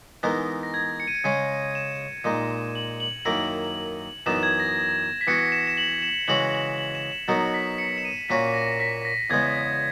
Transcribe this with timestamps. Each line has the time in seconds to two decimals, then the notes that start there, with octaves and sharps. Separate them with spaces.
0.23 E3 G#3 B3 D#4 A#4
0.63 A#6
0.74 G#6
1.00 C#7
1.07 D#7
1.15 C#7
1.24 C#3 G#3 C#4 G#4 D#7
1.75 E7
2.24 A#2 G#3 D#4
2.75 F#7
3.00 F#7
3.25 F#2 D#3 A#3 E4 A#4
4.26 F#2 E3 B3 D#4 E7
4.43 G#6
4.60 A#6
5.21 B6
5.27 E3 B3 F#4 C#7
5.52 E7
5.67 E7
5.77 F#7
6.02 E7
6.28 C#3 E3 G#3 C#4 F#4 F#7
6.55 F#7
6.78 F#7
6.95 E7
7.12 E7
7.28 B2 F#3 B3 D#4 A#4 C#7
7.54 B6
7.78 C#7
7.98 E7
8.05 D#7
8.29 A#2 A#3 C#4 F#4 C#5 B6
8.48 B6
8.54 A#6
8.80 B6
9.05 A#6
9.30 E2 C#3 G#3 B3 G#6